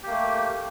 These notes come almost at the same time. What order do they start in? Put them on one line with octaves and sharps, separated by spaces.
G4 A#3 A3